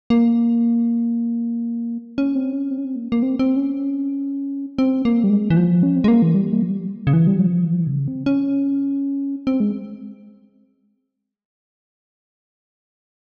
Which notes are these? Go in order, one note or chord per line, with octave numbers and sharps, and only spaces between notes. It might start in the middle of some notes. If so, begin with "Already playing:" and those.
A#3
C#4
C4
C#4
C4
C#4
C4
A#3
A#3
C4
C4
C#4
C4
A#3
G3
G#3
E3
F3
C#4
C4
G#3
A#3
E3
G3
A#3
F3
G3
C#3
E3
G3
F3
E3
F3
E3
C3
C#3
C4
C#4
C4
G#3